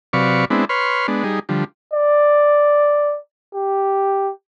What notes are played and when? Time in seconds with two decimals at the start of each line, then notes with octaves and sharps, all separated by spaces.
0.13 C3 F#3 B4 D5 F5 C#6
0.50 G#3 B3 C4 D4 E4
0.69 B4 C#5 C6 F6
1.08 G#3 B3 D4
1.24 G3 D#4 G#4
1.49 D3 F3 G3
1.94 D5
3.55 G4